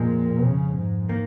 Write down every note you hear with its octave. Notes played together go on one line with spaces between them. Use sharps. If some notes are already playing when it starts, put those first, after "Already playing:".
Already playing: F2 A#2 F3 G#3
C#3
G#2
D#3 A#3